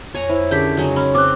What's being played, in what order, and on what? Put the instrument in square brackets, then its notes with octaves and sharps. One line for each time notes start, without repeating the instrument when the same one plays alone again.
[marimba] F2 [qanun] C#5 G#5 A#5
[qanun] E4 [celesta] C5
[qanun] D3 G4 [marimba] C#4 G#4 A#4 [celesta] G6 B6
[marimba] C#3 [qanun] F#3 G#3 D#4
[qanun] C#4 [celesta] B5
[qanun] C4 [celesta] D6 F#6